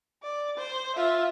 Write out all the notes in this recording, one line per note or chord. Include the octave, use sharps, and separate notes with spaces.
D5
C5
F4 E5